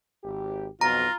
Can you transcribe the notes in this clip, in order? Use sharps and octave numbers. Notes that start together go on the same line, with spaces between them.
G#1 G4
B1 F2 B2 F4 A#5 A#6